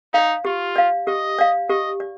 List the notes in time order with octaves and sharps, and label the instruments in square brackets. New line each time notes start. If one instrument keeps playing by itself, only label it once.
[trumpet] D#4 [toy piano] D5 F5
[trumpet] F4 [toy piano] G4
[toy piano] D5 F5
[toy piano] G4 [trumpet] D#5
[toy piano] D5 F5
[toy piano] G4 [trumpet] D#5
[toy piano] D5